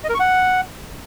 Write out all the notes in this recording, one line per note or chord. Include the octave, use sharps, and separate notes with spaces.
D#5
A#4
C#6
F#5